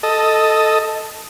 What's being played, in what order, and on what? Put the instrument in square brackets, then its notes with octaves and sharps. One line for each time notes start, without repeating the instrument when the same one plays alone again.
[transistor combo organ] A4 D#5